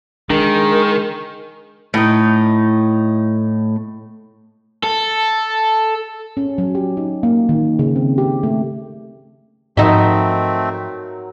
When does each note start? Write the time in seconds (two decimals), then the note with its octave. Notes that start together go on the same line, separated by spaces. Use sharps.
0.30 D#3 G#3 D4 A#4
1.94 A2 D#4
4.84 A4
6.37 C#4
6.58 F#3
6.75 G4
6.97 D#4
7.23 A#3
7.49 D#3
7.79 C#3
7.96 C4
8.18 G4
8.43 A3
9.77 G#2 F3 F#3 A3 C4 D#4 A#4 E5